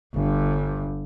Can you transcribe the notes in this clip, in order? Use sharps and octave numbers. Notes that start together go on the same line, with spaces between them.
G1 G2